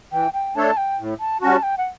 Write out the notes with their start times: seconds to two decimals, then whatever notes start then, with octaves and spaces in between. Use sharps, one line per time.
0.12 E3 G5
0.33 G5
0.55 A3 D4 A4 C#5 A5
0.77 G5
0.99 A2
1.20 A5
1.41 G3 C#4 F#4 A5
1.63 G5
1.78 F#5